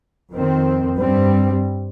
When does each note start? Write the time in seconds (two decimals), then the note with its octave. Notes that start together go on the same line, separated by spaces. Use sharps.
0.31 F2 D#3 C4
0.98 G2 G3 C4